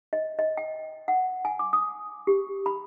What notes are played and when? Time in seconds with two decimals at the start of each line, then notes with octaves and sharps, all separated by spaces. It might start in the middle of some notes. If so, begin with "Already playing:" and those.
0.13 D#5
0.39 D#5
0.57 G5
1.08 F#5
1.45 G#5
1.59 D6
1.73 D#6
2.27 G4
2.66 B5